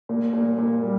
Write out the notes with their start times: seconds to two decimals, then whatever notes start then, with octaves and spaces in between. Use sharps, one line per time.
0.09 A#2
0.33 A#2
0.58 A#2
0.83 G3